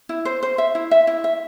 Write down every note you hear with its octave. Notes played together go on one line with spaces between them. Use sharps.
E4
C5
C5
E5
E4
E5
E4
E5